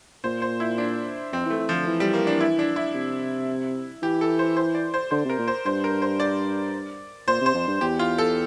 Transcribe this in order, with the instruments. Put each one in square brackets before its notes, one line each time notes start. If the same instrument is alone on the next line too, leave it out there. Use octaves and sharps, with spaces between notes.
[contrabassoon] A#2 [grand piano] C5
[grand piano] C5
E4
D4
[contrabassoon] F2 [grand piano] C4
[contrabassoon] E3 [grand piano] A3
[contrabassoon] E3
[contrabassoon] D3 [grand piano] F3
[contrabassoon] E3
[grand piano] G3
A#3
D4
E4
D4
E4
[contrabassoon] C3
[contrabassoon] E3 [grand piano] G4
[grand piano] A4
C5
C5
D5
C5
[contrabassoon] D3 [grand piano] C5
[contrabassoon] C3 [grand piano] A#4
[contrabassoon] A#2
[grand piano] C5
[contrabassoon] G2 [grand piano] C5
[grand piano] A#4
C5
D5
[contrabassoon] A#2 [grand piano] C5
[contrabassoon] C3 [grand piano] C5
[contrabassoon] F2
G2
[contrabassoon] E2 [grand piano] G4
[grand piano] F4
A4